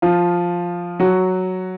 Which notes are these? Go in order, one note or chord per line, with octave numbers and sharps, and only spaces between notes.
F3 F4
F#3 F#4